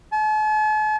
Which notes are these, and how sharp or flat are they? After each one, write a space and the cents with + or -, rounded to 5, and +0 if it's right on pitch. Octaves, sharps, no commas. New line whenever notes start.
A5 -45